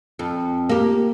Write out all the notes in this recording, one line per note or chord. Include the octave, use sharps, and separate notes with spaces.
F2
A#3 G4